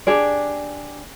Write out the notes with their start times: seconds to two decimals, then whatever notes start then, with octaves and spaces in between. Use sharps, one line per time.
0.07 D4 G4 G#4 D5